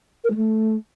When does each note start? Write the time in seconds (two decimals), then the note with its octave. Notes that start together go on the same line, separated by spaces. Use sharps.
0.24 A#4
0.30 G#3
0.35 A3